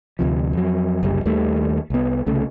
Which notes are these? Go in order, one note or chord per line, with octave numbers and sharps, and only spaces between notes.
D2 C3 F3
F2 F#3
F#1 C2 F#2 G3
D#2 D#3 G3 A3
C2 B3
C2 C#3 A3